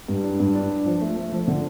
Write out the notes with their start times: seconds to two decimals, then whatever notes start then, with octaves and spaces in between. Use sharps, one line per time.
0.08 G2
0.24 D4
0.40 G2
0.55 D4
0.70 D4
0.86 F3
1.01 A3
1.16 A3
1.32 F3
1.48 D3